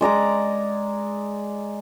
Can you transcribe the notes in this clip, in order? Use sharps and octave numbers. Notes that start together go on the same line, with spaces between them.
G#3 D5 A#5 D6